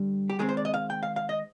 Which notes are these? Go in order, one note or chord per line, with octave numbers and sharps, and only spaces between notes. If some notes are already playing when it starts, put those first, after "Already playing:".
Already playing: G2 D3 G3
G4
D#3 G#3 C4 G#4
C5
D5
D#5
F5
G5
F5
F5
D#5